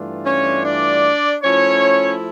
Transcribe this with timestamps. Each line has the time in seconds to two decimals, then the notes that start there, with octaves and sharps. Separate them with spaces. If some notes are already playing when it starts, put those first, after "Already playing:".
Already playing: G2 E3 A3 D4 F4
0.24 C#4 C#5
0.64 D4 D5
1.43 F3 A3 C#4 E4 C#5